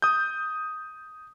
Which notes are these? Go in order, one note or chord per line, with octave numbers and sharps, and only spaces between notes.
D#6 G6